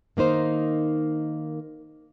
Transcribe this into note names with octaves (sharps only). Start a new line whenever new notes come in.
D#3 A#3 D#4 C5